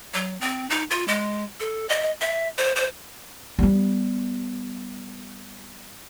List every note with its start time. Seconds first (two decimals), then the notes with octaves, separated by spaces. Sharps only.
0.14 F#3
0.41 C4
0.70 D#4
0.91 F4
1.08 G#3
1.60 A4
1.89 D#5
2.21 E5
2.58 C5
2.76 C5
3.59 G3 B3